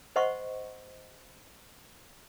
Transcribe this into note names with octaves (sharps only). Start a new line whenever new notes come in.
C5 D#5 F#5 C6 C#6